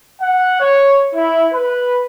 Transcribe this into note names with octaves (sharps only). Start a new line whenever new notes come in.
F#5
C#5
E4
B4